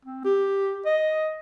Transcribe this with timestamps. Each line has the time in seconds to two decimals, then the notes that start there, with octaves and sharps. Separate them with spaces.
0.05 C4
0.25 G4
0.86 D#5